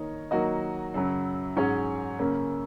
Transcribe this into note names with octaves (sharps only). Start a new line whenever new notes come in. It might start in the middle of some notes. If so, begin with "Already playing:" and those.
Already playing: D#3 A#3 D#4 A#4 C#5
D#3 F#3 A#3 F#4 D#5
F#2 C#3 F#3
G#2 F#3 C#4 G#4 C#5
F#2 C#3 A#3 C#4